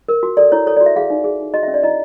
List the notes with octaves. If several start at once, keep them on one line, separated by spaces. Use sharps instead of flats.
A#4
F#4
A4 D5
E4 C#5
A4 C#5
F#4 D5
E5
G#4 F5
D#4
G#4
D#4
F#4 D#5
C#4 E5
D5
E4 D#5